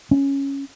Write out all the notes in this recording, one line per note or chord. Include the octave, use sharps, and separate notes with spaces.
C#4